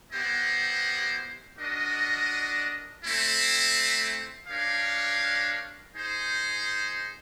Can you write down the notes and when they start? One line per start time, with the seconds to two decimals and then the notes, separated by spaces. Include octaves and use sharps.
0.12 B3 E4 G4 C5 D#5
1.57 D4 F#4 A#4 D#5
3.02 A3 C4 E4
4.47 D4 G4 A#4 C#5 F5
5.93 D#4 G#4 C5